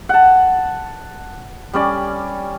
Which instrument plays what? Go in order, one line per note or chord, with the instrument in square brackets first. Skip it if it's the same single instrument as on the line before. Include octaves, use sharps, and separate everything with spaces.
[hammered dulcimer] F#5 A5
G3 C#4 D5